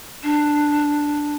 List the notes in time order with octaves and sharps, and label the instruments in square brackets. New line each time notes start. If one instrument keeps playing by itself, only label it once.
[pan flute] D4